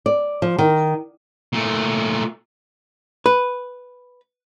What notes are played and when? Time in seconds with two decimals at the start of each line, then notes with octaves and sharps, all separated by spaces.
0.06 D5
0.42 F3
0.59 D#3
1.53 A#2 A3
3.26 B4